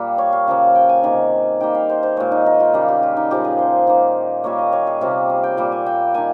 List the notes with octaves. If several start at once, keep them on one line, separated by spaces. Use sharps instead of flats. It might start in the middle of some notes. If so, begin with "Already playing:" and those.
Already playing: A#2 G3 A#3
C#5
F5
C#3 F3 A#3
G5
G#5
C3 D#3 A#3
D#3 G3 A#3 G5
F5
C5
C5
A#2 G#3 C#5
D#4
D#4
F4
C#3 G3 A#3 G#4
G4
F4
D#4
A#2 F3 G#3 G4
G#4
C5
D#3 A#3
A#2 G3 A#3 C#5
D#5
C#5
G#4
C3 G3 A#3 F4
G#4
G5
A#2 G3 A#3 G5
G#5
G5
D#3 A#3 G#5